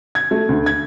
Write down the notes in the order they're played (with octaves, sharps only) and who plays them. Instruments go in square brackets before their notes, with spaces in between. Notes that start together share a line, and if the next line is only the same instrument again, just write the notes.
[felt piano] G#6
A3
D2
G#6